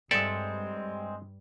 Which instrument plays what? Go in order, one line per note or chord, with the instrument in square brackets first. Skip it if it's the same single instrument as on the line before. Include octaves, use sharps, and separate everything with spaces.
[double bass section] G2 G3 [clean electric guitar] G#3 C4 [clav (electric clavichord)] A4 D5 E5